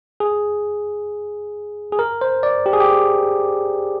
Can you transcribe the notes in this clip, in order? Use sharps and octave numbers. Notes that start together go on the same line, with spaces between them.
G#4
G#4
A#4
C5
D5
G4
G#4
G4